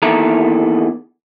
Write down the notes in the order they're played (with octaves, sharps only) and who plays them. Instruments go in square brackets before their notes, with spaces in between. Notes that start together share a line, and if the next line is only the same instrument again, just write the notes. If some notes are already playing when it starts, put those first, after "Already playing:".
[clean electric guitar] E2 D#3 A#3 E4 A4 A#5